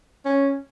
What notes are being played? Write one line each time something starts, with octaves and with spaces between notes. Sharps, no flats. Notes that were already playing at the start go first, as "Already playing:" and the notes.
C#4